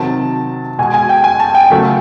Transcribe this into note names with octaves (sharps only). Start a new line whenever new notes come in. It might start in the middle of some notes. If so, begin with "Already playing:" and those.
Already playing: C3 D#3 F#3 A5
B2 G#3 G#5
G#5
G5
G#5
A5
G5
C#3 F#3 A3